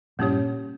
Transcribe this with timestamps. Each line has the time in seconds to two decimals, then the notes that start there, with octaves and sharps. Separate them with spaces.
0.19 G2 A#2 A#3 C#4 G4 C#5